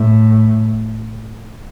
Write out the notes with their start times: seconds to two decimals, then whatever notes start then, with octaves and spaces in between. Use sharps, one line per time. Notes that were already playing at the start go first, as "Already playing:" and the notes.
Already playing: A2